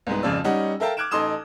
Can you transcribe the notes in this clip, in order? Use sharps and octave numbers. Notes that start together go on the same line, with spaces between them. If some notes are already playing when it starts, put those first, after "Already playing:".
C2 G#2 B3
G#1 F2 C#3 F3 D5 E6
G3 C#4 D#4 F#5
A4 A#4 E5 F5 G5 A5
D6 F6 F#6 G#6 D7 E7
A1 D#4 A4 C6 D#6 E7